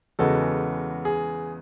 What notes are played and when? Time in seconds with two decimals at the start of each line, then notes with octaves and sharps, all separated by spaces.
0.19 E2 C#3 G#3 B3 F#4 A4
1.05 G#4